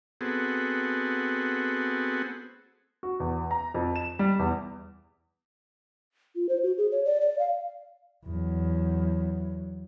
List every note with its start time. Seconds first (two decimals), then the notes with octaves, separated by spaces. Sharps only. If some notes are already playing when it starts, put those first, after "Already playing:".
0.21 B3 C4 F#4 G#4 A4
3.03 F#4
3.20 E2
3.51 A#5
3.74 F2
3.96 E7
4.19 G3
4.39 E2
6.36 F4
6.49 C5
6.63 F#4
6.78 G#4
6.92 C#5
7.05 D5
7.21 D5
7.39 F5
8.26 E2 F#3